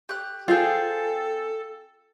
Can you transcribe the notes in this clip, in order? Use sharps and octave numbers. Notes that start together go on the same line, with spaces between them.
G4 F#6
C4 F4 G#4 A4 G5